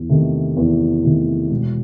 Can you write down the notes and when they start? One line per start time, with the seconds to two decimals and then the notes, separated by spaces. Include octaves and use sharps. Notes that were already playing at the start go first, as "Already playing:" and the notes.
Already playing: E2
0.09 C3 D#3 A3
0.57 E2
1.04 C3 D#3 A3
1.50 E1